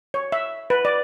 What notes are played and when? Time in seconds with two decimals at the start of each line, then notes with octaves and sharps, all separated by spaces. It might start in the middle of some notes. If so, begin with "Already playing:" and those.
0.14 C#5
0.32 E5
0.70 B4
0.85 D5